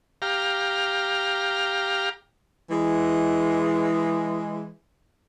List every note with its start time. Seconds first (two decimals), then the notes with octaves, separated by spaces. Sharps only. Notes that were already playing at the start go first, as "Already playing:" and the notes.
0.22 G4 F5 A#5
2.71 E3 G#3